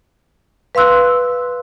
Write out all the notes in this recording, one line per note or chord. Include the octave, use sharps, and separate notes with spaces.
B4 F5 C6 E6 F#6